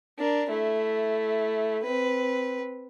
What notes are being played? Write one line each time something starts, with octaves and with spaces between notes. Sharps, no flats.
D4 A#4
A3 E4
C4 B4